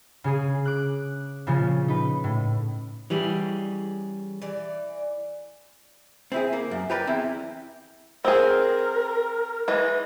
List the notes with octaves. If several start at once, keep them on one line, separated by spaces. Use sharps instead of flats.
C#3 G#4 D#6
D6 F#6
A#2 C#3 F3 C#4
D#4 B4
A2
E3 G3 C#4 G#4
E3 D5
C4 E4 G#4
A#3
F#2
G4 A#4 B4 D5 G5
E2 C4 E4
C4 G#4 A#4
E3 G#3 D#5